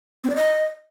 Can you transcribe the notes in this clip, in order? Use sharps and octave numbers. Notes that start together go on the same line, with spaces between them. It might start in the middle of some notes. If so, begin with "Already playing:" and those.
C4
D5
D#5